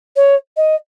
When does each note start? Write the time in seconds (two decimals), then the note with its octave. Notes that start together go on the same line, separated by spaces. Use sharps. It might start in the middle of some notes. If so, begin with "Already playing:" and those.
0.16 C#5
0.57 D#5